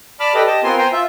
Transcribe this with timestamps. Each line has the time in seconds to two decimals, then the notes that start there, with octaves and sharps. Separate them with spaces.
0.20 D5 A5 B5 D6 F6
0.34 G4 A4 B4 D5 D#5
0.46 G4 D#5 A5
0.64 B3 C4 F4 A#4 G#5 C6
0.78 C5 G5 G#5 A#5 C6
0.92 F4 E5